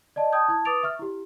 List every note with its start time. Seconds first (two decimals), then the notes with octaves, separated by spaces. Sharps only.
0.16 D5 D#5 A5
0.32 G5 A5 D#6 G6 G#6
0.48 E4 A5 G#6
0.65 B4 D6 D#6 A6 D7 F7
0.83 E5 C#6 F6
0.99 E4 G4